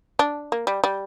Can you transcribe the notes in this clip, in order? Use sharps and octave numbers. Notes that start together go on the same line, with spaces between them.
D4
A#3
G3
G3